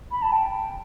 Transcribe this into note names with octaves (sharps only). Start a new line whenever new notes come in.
B5
A5
G5